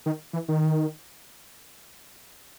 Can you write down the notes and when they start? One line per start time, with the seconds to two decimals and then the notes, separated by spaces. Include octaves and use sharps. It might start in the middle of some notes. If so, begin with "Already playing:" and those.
0.06 D#3
0.33 E3
0.48 D#3